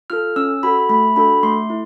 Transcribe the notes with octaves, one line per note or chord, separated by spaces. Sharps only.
F4 A4 F6
C#4 E6
F#4 A4 B5
A3 B5
D4 F#4 A4 B5
A3 C6
E4